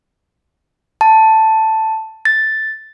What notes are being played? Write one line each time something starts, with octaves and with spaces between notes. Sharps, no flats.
A5
A6